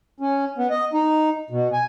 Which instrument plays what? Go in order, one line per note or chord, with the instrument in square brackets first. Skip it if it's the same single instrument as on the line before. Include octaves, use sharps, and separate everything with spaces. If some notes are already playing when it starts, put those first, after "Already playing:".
[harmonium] C#4
B3
D#5
D#4
B2
G#5